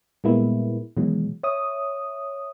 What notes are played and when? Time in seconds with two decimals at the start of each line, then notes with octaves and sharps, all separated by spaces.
0.24 A#2 G3 G#3 A#3 B3 E4
0.97 B2 D#3 E3 F#3 G#3
1.43 C#5 E5 D#6